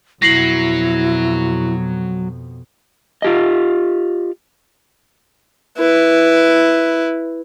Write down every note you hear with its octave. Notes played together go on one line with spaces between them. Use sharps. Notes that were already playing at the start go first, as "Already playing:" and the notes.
F2 B2 F#3 E4 A#6 C7 F#7
F4 G4 D#5
E4 B4